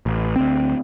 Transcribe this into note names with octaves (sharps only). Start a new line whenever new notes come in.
A1
D2 C4